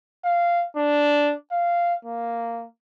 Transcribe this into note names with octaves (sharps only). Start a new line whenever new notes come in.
F5
D4
F5
A#3